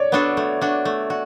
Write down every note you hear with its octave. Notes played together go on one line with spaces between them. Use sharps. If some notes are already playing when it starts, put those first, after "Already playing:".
Already playing: C#5 D5
B3 D4 F#4 A4
A3
D4 F#4
A3
F#4